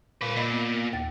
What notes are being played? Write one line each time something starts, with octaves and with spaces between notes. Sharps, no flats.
A#2 F4 B4
A#2 D#5 B5
B3
D#2 A6